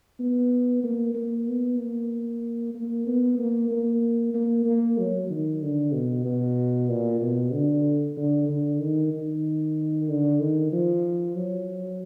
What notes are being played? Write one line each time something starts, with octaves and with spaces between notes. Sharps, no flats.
B3
A#3
A#3
B3
A#3
A#3
B3
A#3
A#3
A#3
A#3
F#3
D#3
D3
B2
B2
A#2
B2
D3
D3
D3
D#3
D#3
D3
D#3
F3
F#3